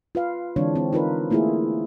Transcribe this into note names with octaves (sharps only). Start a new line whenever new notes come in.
F4 B4 F5
D3 E3 G#3 C4 D4 C#5
C4
D#4 F4 A#4 B4
A3 A#3 E4 F4 G#4